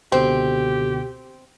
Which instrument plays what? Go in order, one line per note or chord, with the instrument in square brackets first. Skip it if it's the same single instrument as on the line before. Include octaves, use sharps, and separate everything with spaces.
[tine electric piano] C#2 B2 D3 [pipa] C4 [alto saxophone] G4